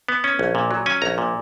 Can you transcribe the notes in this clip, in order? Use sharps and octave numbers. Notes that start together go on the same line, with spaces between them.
B3
C#4
A#1
A#2
F#3
C#4 G#5
A#1 A#5
A#2